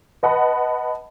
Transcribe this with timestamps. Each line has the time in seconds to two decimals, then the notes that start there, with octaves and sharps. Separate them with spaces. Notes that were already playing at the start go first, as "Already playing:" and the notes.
0.23 B4 D#5 F#5 A5 B5